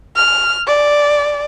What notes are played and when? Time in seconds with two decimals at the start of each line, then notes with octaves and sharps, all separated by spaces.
0.16 F6
0.67 D5